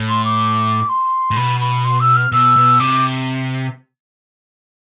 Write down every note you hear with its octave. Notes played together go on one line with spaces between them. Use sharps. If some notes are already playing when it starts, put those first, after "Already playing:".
Already playing: A2
C6
D6
C6
A2
B2 B5
B5
C6
E6
F6
B2 E6
B2
C3 D6